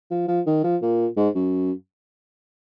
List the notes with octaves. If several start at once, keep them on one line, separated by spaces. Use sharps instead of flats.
F3
F3
D#3
F3
A#2
G#2
F#2